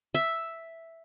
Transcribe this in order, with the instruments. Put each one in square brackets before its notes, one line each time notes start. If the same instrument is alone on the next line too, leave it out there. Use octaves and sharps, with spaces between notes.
[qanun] E5